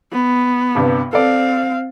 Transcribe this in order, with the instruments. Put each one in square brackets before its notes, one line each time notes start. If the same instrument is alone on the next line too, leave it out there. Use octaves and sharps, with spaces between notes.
[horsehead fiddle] B3
[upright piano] G1 G2 C3
[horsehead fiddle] C4 F5 [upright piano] A4 D5